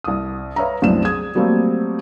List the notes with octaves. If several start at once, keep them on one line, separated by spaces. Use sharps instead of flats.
C2 D#6
B4 C#5 E5 F5 A#5
C2 F#2 A2 C4 D4 E7
G#4 D#6 G#6
F#3 G3 A3 A#3 C4